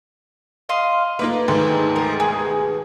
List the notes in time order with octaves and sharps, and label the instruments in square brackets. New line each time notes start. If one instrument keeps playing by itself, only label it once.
[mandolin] D#5 F5 C6
[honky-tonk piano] A3 A#3 F4 [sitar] B4 [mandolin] D6
[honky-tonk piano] D2 G#2 D#3 [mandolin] A4
[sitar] F3 [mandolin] A#4
[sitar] D#2 B2 [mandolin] G#4